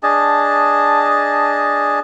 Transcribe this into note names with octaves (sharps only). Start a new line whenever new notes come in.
D4 G#4 D#5 A5